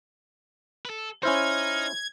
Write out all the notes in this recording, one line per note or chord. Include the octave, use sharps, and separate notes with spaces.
A4 B4
C#4 D#4 E4 C5 F6 G#6